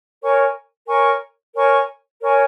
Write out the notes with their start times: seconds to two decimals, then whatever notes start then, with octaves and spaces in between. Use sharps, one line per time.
0.22 A#4 C#5 G#5 C#6
0.88 A#4 C#5 G#5 C#6
1.54 A#4 C#5 G#5 C#6
2.20 A#4 C#5 G#5 C#6